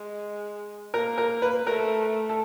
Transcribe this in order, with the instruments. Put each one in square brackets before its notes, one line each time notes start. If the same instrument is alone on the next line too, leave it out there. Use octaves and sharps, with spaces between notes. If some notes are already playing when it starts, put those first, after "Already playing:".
Already playing: [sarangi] G#3
[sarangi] A#3 [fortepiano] A#4
[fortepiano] A#4
B4
[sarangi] A3 [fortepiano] A#4
[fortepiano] A4